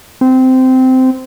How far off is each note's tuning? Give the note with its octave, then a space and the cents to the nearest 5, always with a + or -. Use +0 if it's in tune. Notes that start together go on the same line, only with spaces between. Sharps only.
C4 -15